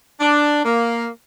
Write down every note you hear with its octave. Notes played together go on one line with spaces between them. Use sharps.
D4
A#3